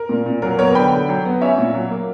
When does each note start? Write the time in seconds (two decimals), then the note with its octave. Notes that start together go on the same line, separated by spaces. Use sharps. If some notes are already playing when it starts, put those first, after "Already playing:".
Already playing: A#4
0.09 A#2
0.26 A#2
0.42 F#3 A#4
0.59 B3 A#4 C#5
0.75 D3 G5 B5
0.92 D3
1.09 F#3
1.25 B3
1.41 C#4 C#5 E5
1.58 A#2
1.74 F#3
1.91 A#3